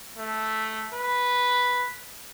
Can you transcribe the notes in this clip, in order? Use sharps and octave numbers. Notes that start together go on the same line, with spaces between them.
A3
B4